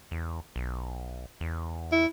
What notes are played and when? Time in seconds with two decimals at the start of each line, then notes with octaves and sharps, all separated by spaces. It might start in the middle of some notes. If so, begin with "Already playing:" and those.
0.11 E2
0.56 B1
1.41 E2
1.92 E4